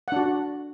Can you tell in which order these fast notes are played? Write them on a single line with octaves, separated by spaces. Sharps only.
F#5 D4 F#4